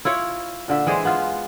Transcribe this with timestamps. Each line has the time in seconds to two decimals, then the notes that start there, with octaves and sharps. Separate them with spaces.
0.05 E4 F4 C#5
0.68 A#2 D3 E5
0.87 E3 G#3 G#4 C5
1.05 B3 F4